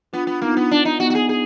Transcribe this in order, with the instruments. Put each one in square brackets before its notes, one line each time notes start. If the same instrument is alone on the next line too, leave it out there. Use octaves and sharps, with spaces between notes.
[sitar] B3 [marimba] D4 F4
[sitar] B3
[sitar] A#3 [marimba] B3 D#4
[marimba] D4 F4
[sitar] B3
D4
D#4
[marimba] B3 D#4 [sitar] F#4
[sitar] F#4
G#4
G#4